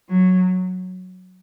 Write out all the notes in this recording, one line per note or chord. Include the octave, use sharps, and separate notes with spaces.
F#3